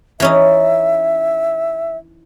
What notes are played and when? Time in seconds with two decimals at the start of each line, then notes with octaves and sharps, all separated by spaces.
0.20 E3 C#4 D#4 E5